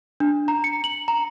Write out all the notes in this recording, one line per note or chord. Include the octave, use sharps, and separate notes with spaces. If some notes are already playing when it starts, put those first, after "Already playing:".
D4
A#5
C#7
F#7
A#5